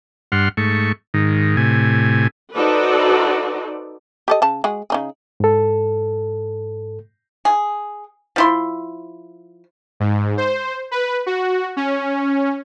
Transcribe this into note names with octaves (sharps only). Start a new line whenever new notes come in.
G2 F#5 C6 F6
G#2 A3 C#6
G#2 D#3
A2 C3 G#5
D#4 F#4 A4 B4 C5 D5
G4 A4 D#5
C#3 A5
G#3 F#4 G#4
C#3 D#4 G#4
G#2 A4
G#4
F3 E4 C6
G#2
C5
B4
F#4
C#4